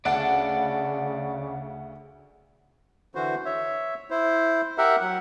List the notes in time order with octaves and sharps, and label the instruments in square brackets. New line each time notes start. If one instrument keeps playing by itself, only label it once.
[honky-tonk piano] D2 F#5 [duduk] C#3 [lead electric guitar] D5 A5
[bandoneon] D3 E3 F#4 C5
C#5 E5
E4 C5
G4 A#4 E5 F#5
F#3 F#5